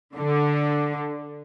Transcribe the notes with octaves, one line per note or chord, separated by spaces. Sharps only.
D3